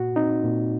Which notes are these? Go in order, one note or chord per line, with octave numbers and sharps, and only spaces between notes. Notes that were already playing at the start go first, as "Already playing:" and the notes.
Already playing: A#2 F#4
C4 D#4
A#2